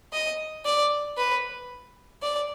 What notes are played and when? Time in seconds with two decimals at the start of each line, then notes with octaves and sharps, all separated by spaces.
0.13 D#5
0.65 D5
1.18 B4
2.23 D5